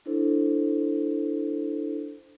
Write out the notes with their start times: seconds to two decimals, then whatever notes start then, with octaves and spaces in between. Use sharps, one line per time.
0.06 D4 E4 A4 C5